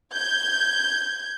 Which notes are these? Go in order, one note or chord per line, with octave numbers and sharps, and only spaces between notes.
G6 G#6